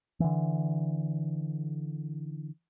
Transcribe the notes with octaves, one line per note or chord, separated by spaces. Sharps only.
D3 E3